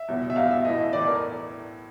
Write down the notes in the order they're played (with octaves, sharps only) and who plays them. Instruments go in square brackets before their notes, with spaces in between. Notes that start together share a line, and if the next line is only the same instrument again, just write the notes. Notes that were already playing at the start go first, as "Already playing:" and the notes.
Already playing: [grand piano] E5
[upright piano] E2 B2 G3
[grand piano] E5
[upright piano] E2 B2 G3 [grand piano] F5
[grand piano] E5
[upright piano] A2 E3 A3 [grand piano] D#5
[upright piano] A2 E3 A3 [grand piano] D5
[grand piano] A#4